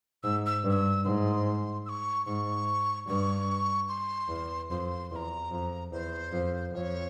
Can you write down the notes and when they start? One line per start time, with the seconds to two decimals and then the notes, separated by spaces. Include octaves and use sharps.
0.24 G#2 E6
0.46 E6
0.64 G2
0.70 E6
1.05 G#2 C6
1.86 E6
1.89 C#6
2.26 G#2 C#6
3.08 G2 C#6
3.89 C6
4.29 E2
4.70 F2 C6
5.11 E2 A#5 C6
5.51 F2
5.92 E2 C5
6.33 F2
6.73 F2 C#5